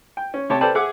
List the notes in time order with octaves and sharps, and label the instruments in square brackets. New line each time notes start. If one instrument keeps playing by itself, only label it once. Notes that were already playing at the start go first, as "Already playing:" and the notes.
[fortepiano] G5
C#4
C3 G4 C#5 A5
A4 B4 C5 D5 G5 A5
G#4 E5 F#5 D6